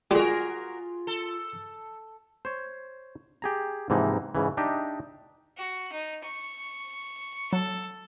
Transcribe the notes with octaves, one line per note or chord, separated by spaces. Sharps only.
G3 G#3 F4 F#4 G#4 A#4
A4
C5 C#5
G4 G#4 A#5
G#2 C3 E3 F3 A#3 D#4
G#2 C#3 E3
D4 D#4 G4 D#5 E5
F#4
D#4
C#6
F#3 A4